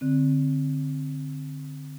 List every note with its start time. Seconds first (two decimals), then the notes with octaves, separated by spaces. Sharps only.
0.01 D3 C4